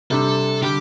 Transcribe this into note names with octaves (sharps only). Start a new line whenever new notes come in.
C3 G3 D4 A4
D3 G3 G4